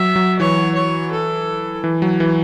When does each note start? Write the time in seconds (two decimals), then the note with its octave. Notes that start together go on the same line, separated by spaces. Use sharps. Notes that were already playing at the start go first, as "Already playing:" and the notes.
Already playing: F#3 E5
0.16 F#3
0.39 E3 C#5
0.75 C#5
1.12 A4
1.84 E3
2.02 F#3
2.20 E3